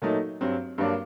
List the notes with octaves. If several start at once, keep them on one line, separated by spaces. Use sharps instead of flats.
A#2 F#3 A3 D#4
G2 F#3 C4
G2 F#3 A#3 D4